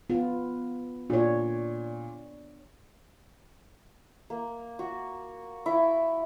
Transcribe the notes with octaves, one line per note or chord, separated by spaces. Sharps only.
B3 F4
A#2 D4 C#5
A#3
F#4
E4